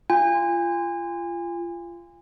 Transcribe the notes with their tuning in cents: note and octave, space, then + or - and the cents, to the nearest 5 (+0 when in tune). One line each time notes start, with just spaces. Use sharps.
F4 -25 G#5 -35